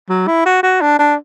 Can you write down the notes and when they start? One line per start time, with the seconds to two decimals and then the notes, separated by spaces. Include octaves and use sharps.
0.10 F#3
0.27 E4
0.46 F#4
0.63 F#4
0.81 D4
0.99 D4